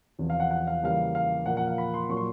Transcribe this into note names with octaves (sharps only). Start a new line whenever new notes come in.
E2 C3 F3
F5
F#5
F#5
F5
C#3 E3 G3 A#3 F5
F5
A#2 F3 A#3 F#5
F#5
F5
B5
C6
A#2 F#3 A#3 C#6
C6